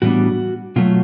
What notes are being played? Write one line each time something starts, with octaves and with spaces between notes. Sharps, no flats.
A2 E3 G3 B3 D4 F#4
B2 F#3 A3 F4